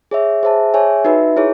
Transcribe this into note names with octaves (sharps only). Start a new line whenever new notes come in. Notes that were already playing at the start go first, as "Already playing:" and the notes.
G#4 C#5 E5
G#4 C5 E5 A5
G#4 C#5 E5 G#5
D#4 F#4 B4 E5
E4 G#4 C#5